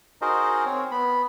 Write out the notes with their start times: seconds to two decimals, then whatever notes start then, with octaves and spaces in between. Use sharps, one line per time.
0.22 D#4 F#4 G#4 A#4 C5 D#5
0.66 C4 C#5
0.91 B3 B5